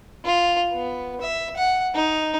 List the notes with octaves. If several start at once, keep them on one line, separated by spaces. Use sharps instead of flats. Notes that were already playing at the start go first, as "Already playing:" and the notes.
F4
B3
E5
F#5
D#4